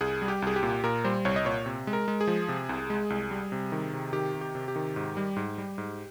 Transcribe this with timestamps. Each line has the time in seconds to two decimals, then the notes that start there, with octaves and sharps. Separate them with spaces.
0.01 C2 G#4
0.22 G3
0.28 G4
0.42 C2 G#4
0.56 G4
0.63 A#2
0.83 A#2 A#4
1.04 G3 C5
1.25 C2 C#5
1.36 D#5
1.45 A#2 C#5
1.66 C3
1.87 G#3
1.93 A#4
2.08 G#3
2.21 G#4
2.27 F3
2.48 C3
2.69 C2
2.90 G#3
3.10 C2
3.31 G3
3.52 C3
3.72 D#3
3.93 C3
4.13 D#3 G4
4.34 C3
4.41 G4
4.55 C3
4.68 G4
4.76 D#3
4.96 G#2
5.17 G3
5.36 G#2
5.58 G3
5.78 G#2